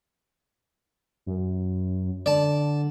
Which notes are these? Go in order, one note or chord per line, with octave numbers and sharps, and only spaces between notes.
F#2
D3 D5 A5